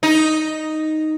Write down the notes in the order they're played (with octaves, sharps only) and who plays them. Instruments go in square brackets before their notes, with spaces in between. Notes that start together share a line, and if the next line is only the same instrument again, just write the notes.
[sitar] D#4